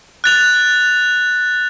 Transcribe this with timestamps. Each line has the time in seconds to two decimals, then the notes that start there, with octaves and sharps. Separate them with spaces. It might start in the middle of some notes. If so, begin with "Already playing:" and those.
0.24 F#6 A6 F7